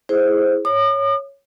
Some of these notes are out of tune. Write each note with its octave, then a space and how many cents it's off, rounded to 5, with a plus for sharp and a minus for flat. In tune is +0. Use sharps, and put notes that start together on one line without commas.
E4 +0 G#4 +0 C5 +0
C#5 +0 D#6 -45